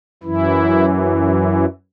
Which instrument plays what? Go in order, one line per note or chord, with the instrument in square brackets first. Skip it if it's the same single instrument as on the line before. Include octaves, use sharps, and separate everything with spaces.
[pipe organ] F#2 E3 E4